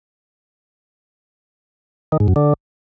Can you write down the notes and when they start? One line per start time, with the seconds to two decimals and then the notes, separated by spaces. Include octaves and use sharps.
2.12 D#3
2.20 G#2
2.28 F#2
2.36 D3